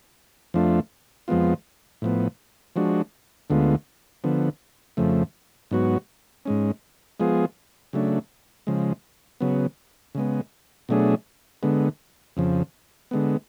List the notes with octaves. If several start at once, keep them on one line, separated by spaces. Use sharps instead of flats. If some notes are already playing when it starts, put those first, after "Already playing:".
F2 F3 A3 D4 F4
F2 F3 G#3 B3 F4
A2 F3 B3
F3 G#3 D4 F#4
D2 D3 G#3 B3 F4
D3 F3 B3
F2 C#3 F3 A3
G#2 F#3 B3 F#4
G#2 G#3 C#4
F3 G#3 B3 F4 G#4
C#3 F#3 A3 D4
C#3 F3 G#3
C#3 F#3 B3
C#3 G#3 B3
B2 F#3 A3 D4 G#4
D3 G#3 B3
F2 C#3 F3
D3 G#3 B3